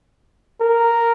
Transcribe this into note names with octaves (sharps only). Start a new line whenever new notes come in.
A#4